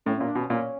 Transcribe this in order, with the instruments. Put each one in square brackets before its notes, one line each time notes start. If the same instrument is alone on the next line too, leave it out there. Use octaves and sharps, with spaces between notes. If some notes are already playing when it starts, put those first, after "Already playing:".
[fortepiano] A2 [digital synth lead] C#4
[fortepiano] A#2 [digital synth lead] C#4
[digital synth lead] D4
[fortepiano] B2
[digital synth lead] C#4
[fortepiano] A#2 [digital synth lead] C#4